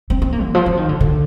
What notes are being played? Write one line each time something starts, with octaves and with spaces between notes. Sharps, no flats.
C4
C4
A#3
D3
F3
F3
D#3
D3
D3